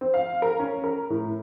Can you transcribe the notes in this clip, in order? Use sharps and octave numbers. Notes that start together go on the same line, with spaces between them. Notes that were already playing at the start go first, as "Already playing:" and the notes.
C4
F5
A#4
C#4
A#4
A2